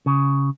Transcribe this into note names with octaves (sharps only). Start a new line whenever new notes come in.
C#3